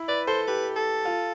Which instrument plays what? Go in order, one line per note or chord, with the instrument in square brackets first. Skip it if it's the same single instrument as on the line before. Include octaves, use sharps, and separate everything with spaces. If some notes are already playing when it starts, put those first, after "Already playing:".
Already playing: [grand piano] E4
[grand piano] B4 [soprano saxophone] D5
[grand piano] A4 [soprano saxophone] C5
[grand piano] G4 [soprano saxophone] B4
[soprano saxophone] A4
[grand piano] F4